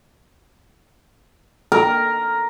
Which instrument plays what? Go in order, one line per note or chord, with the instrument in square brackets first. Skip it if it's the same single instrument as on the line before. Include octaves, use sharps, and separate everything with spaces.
[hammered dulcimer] A#4